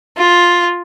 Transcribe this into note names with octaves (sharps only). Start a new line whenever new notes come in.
F4